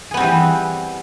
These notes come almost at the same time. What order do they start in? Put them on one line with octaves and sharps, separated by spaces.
G#4 B3 C4 G3 E3